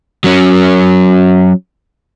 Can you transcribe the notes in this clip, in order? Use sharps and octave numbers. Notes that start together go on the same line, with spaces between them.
F#3 C#4